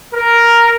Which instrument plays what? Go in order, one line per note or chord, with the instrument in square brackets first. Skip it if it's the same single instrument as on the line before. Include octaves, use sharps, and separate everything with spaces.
[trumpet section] A#4